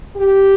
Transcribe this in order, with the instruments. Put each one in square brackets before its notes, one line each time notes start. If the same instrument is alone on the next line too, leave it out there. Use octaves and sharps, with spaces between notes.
[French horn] G4